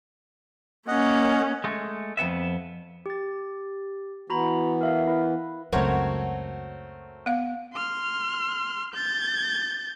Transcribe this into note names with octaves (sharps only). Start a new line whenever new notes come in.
A#3 C#4 D#5 F#5
G#3 A3
F2 G#2 B3 E5
G4 A6
E3 B3 F#4 A#5 B5
A#4 E5 F5
E4 B4
C#2 F#2 A3 C4 F#4 A#4 C#5
B3 F5
C6 F6
G6 A6